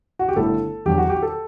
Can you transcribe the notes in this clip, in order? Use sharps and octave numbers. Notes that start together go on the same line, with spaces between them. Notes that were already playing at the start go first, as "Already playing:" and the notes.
F#4
G4
G1 G2 D3 A3 E4 A4
E2 D3 F#3 G4
F#4
G4
A4